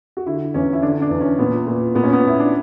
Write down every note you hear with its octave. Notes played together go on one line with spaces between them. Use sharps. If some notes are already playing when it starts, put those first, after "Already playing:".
F#4
D3 E4
E2 C#4
E4
D3 D4
D4
E2
C#4
A#2 B3
A#2
A#2 B3
C#4
B3
A#2 E4
D4